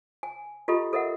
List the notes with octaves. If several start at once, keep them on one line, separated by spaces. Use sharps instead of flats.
G#5
F4 G4 A4 D#5 B5
A4 A#4 D#5 E5 F#5